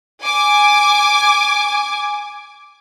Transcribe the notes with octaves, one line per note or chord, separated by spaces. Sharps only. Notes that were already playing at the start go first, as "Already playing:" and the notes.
G#5 D6